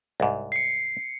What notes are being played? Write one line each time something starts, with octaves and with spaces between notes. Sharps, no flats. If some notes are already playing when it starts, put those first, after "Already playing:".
C2 G#2
C7 C#7